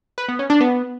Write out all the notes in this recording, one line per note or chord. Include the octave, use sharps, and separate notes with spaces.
B4
B3
C#4
D4
B3